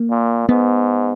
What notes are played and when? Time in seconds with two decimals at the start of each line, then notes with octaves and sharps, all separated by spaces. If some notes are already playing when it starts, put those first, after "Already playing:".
Already playing: A#3
0.10 A#2
0.49 G#2 B3